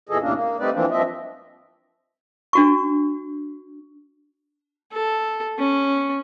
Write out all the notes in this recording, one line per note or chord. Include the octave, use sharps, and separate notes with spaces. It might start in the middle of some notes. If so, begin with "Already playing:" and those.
E2 A#2 E3 G#4 A4 D#5
D#2 A2 C3 A#3 C#4 D4
A#3
G3 A3 C4 D#4 B4 D5
E3 F3 A#3 C4 D4
G2 F3 C4 D#5 E5
D4 F#4 C#6
A4
C#4